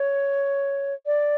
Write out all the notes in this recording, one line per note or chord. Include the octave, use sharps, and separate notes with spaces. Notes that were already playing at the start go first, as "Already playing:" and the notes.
Already playing: C#5
D5